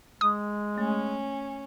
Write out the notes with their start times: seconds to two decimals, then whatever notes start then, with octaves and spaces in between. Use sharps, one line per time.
0.21 G#3 D#6
0.78 A3 C#4